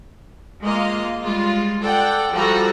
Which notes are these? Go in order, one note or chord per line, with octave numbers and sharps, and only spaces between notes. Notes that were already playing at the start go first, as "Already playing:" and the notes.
G#3 A#3 F4 D#5 F5
G3 G#3 F4
A4 D5 F#5 G5
F3 G3 F#4 A4 A#5